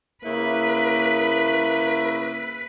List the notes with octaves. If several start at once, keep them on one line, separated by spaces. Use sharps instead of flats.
C#3 A#3 E4 B4